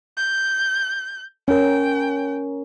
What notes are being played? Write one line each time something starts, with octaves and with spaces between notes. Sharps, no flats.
G6
C#4 A#4 G5